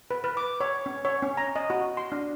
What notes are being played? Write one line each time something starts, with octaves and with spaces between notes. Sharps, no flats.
B4
B4
D6
C#5
C#4
C#5
C#4
A#5
D#5
F#4
C6
D4